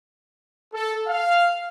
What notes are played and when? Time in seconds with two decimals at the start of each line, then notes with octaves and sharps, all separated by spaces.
0.73 A4
1.07 F5